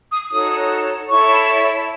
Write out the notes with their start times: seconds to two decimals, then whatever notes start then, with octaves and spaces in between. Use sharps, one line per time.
0.11 D#6
0.30 D#4 F#4 A4 C#5 D#6
1.08 E4 A4 C#5 C#6